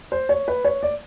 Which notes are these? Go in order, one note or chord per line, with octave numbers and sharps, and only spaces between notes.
C5
C#5
B4
C#5
D5